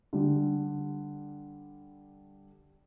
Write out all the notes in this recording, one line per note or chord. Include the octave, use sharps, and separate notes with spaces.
D3 G3